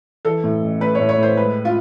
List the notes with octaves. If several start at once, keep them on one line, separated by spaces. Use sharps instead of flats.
E3 A4
A2
A1
A3 B4
C#5
A2
C#5
A2 C5
G#3 B4
F4